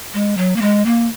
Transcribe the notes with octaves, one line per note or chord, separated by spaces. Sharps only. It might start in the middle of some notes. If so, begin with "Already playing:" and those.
G#3
F#3
A#3
G#3
A#3